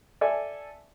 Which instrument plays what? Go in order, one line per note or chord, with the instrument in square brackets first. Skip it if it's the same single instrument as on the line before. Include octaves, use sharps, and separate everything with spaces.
[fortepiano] A4 D5 E5 G#5